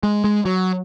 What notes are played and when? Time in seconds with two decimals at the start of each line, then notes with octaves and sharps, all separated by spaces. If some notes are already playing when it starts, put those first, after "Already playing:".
0.03 G#3
0.24 G#3
0.45 F#3